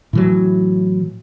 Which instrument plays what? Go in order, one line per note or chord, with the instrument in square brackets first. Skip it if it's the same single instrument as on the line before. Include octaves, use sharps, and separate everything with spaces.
[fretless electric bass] A2 E3 F#3